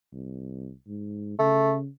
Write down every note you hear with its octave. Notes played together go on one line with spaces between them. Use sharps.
C2
G#2
C#3 A3